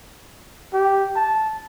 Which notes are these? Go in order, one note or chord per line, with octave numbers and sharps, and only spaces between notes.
G4
A5